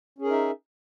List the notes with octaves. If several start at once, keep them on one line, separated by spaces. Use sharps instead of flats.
C#4 D#4 G#4 A#4 E5